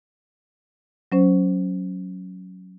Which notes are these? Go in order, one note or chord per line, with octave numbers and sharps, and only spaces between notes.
F#3 C#4 C5